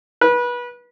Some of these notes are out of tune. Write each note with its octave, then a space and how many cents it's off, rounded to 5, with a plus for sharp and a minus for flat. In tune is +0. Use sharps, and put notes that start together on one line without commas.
B4 -25